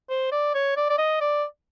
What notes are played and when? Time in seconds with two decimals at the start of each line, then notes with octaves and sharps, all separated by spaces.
0.10 C5
0.32 D5
0.55 C#5
0.77 D5
0.90 D5
0.98 D#5
1.21 D5